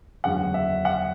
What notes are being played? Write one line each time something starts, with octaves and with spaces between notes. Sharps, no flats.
F#1 E2 D3 F#3 F#5
E5
F#5